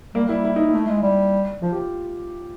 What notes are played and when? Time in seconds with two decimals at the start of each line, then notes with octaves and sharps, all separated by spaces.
0.15 G3 A#3
0.29 G3 E4
0.45 E4
0.56 D#4
0.68 A3 E4
0.88 G#3
1.03 G3
1.62 F3 F4
1.72 G4